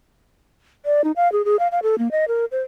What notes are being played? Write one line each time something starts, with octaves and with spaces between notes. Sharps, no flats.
D5
D#4
F5
G#4
G#4
F5
F5
A4
A#3
D#5
A#4
C5